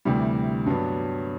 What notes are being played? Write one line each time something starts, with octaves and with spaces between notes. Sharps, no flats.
D2 C3 E3 G3
G2 F#3 B3 D4